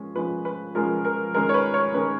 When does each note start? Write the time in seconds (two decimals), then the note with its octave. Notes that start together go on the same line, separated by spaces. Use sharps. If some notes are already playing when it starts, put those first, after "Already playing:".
Already playing: F3 G#3 C#4
0.16 F3 G#3 C#4 B4
0.45 B4
0.75 F3 G#3 C#4 A#4
1.05 A#4
1.34 D#3 G#3 C#4 A#4
1.49 C#5
1.54 B4
1.74 C#5
1.93 D#3 G#3 C#4 B4